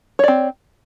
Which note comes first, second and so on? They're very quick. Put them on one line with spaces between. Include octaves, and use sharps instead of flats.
C#5 D5 C4